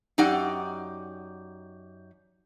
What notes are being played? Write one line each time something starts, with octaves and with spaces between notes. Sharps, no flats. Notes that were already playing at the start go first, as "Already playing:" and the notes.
F#2 D#4 G4 D5 F#5